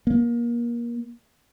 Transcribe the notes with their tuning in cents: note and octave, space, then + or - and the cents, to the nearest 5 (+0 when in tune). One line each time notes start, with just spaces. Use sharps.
A#3 +25